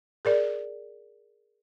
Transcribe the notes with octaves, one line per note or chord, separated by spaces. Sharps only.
G#4 A#4 D5